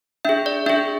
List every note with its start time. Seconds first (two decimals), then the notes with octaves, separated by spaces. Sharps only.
0.25 D4 G#4 E5
0.46 D5
0.66 D4 G#4 E5